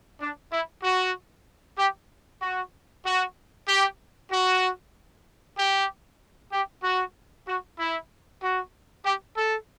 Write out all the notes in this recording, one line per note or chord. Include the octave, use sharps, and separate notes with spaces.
D4
E4
F#4
G4
F#4
F#4
G4
F#4
G4
G4
F#4
F#4
E4
F#4
G4
A4